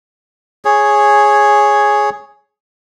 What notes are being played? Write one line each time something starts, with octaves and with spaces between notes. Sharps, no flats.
G#4 C#5